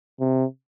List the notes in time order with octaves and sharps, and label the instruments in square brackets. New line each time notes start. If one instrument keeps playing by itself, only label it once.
[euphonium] C3